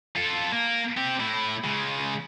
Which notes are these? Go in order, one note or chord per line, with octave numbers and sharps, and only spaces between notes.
F4 A4
A#3
C4 G4
A2 E4
C#3 G#3